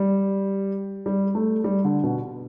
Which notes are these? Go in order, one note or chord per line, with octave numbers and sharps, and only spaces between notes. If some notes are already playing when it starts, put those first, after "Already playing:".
Already playing: G3
G3
A3
G3
D3
B2